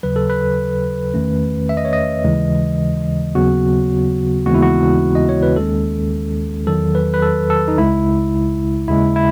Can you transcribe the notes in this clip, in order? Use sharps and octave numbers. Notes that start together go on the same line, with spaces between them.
D#2 C#3 F#3 B4
A4
B4
E2 D#3 A3 C#4
E5
D#5
C#5
D#5
D#2 C#3 E3 G#3
D#2 C#3 F#3 B3 F#4
D#2 C#3 E3 G#3 B3 F#4
E4
F#4
D#5
C#5
B4
D#2 D#3 G#3 C#4 A4
E2 D#3 F#3 A4
B4
B4
A4
A4
D#4
C#2 C#3 G#3 E4
D#2 C#3 G#3 E4
E4